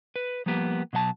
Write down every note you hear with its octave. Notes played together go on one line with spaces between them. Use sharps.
B4
F3 G3 A#3 B3 G4
B2 F#3 D#5 A5